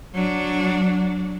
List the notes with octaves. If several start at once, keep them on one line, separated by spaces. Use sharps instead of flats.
F#3 D4